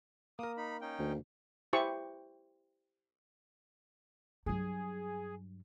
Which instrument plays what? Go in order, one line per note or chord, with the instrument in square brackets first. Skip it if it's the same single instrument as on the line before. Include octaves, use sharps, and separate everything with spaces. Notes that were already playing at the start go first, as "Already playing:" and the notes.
[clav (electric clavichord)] A#3 A#4 [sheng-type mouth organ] D#6
[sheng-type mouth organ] D#4 B5
C#4 D#4 G5
[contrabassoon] D2
[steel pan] E4 G4 C5 C#6
[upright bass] G2 F#3 [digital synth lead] G#4